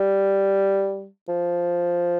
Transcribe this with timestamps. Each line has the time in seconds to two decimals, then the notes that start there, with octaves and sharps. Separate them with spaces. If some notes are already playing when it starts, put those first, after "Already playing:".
Already playing: G3
1.29 F3